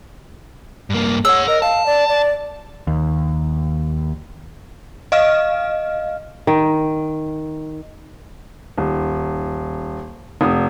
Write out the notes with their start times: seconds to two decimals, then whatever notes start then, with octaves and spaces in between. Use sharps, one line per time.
0.90 G2 A#3
1.25 G#4 C#5 F#5 E6
1.48 A#4 D#5
1.62 F5 A5
1.86 D5
2.09 D5
2.87 D#2
5.12 D#5 F5 F6
6.47 D#3
8.77 D#1
10.41 F1 D#6